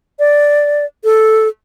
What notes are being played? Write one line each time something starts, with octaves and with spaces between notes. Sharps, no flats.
D5
A4